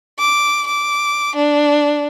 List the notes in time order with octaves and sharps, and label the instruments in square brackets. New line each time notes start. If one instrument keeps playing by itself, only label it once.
[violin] D6
D6
D4